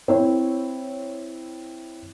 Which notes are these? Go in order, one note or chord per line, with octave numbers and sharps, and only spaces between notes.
C4 E4 C#5